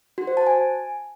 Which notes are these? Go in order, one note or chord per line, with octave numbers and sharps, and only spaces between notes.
F#4
C5
A5
G#5